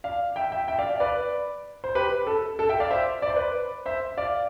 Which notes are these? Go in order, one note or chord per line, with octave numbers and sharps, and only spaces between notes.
D5 F5
E5 G5
E5 G5
E5 G5
D5 F5
D5 F5
B4 D5
C5
G4 B4
A4
A4
E5 G5
D5 F5
C5 E5
D5
C5
B4 D5
C5 E5
D5 F5